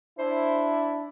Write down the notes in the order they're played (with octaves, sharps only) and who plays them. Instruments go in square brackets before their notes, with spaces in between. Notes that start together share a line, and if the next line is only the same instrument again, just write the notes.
[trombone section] D4 E4 [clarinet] C5